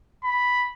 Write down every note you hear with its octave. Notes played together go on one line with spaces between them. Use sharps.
B5